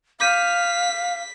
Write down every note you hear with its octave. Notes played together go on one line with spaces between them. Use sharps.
F5 D6 G6 B6 D#7